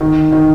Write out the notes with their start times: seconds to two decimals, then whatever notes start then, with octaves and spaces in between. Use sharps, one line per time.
0.01 D#3
0.32 D#3